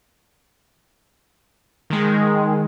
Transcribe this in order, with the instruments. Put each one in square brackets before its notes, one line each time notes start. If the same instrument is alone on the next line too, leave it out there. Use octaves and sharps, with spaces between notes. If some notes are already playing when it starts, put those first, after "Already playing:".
[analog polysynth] D#3 G#3